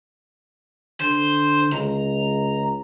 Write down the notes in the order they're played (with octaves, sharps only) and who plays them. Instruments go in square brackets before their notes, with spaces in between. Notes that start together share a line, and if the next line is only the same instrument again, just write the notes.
[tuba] D3 [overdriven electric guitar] C5
[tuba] C#2 [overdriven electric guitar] A#5